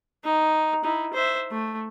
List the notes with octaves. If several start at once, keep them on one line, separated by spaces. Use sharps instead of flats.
D#4
D#4 E4
C5 E5
A3